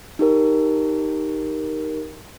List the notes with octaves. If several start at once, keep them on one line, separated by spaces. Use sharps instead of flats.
D#4 G4 A#4